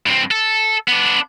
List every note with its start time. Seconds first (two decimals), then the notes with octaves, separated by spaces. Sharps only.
0.06 G2 C4
0.31 A4
0.88 B3 D4